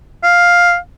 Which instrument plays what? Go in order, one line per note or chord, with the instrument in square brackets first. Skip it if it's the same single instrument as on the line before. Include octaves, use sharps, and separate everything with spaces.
[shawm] F5